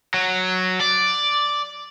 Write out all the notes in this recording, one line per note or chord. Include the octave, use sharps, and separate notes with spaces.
F#3
D5